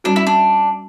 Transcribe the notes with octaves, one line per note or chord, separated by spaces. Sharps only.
G3 C#4 D4 F#4
E4
D4